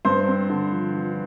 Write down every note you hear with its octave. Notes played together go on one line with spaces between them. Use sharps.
G2 C5 C6
C4
D3
F3
F3